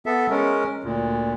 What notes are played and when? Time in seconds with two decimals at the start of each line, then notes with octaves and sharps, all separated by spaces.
0.06 B3 A4 E5
0.30 G#3 C#4 A#4
0.84 D2 A#2